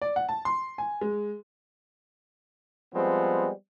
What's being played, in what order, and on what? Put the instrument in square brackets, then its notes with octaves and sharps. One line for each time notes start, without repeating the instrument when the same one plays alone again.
[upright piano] D5
F#5
A5
C6
G#5
G#3
[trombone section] F3 G3 G#3 B3 C4